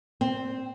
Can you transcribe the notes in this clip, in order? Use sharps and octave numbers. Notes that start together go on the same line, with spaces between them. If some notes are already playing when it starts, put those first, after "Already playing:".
C4